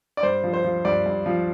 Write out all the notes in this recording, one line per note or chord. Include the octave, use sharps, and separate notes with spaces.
D5
G2 C5
F3
C5
F3
G2 D5
G2
F3